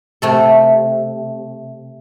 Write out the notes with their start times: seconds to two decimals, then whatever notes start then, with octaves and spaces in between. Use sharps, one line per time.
0.22 C3 A3 A4